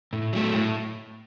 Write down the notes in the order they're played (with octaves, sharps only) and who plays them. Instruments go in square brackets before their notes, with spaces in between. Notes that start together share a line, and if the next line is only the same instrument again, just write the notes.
[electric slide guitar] A2
F#3 A3
A2